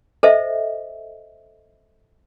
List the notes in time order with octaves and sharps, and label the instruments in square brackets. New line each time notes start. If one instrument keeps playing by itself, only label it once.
[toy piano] A4 C5 D#5 E5